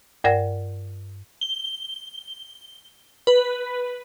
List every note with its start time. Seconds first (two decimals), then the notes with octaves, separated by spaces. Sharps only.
0.24 G2 A#4 D5 F#5 A#6
1.41 G7
3.27 B4